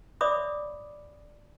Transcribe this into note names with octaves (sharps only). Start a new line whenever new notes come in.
C#5 D5 E5 B5 D6 D#6